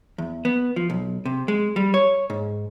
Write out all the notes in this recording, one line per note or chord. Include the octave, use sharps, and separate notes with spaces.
E2
B3
F3
B1
C3
G#3
G3
C#5
G#2